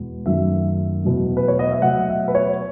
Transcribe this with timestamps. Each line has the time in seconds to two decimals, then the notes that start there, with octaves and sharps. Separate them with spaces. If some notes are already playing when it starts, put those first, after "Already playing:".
Already playing: E2 B2 G#3 B3
0.26 F#2 D#3 F#3 A3 E5
1.04 E2 B2 F#3 A3
1.37 B4
1.48 C#5
1.59 D#5
1.71 E5
1.82 B2 F#3 A3 F#5
2.09 E5
2.28 B4
2.35 C#5